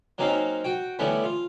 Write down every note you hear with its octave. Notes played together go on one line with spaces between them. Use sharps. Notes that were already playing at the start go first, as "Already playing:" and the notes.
F#3 A#3 C4 C#4 D#4 F5
F#4 G5
D3 E3 G3 A3 B3 C#4
F4